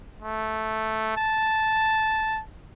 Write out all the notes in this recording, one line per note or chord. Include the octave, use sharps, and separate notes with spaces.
A3
A5